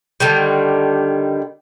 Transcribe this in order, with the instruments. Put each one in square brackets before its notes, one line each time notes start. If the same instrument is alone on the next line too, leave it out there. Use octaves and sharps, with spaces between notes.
[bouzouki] D3 D#3 G3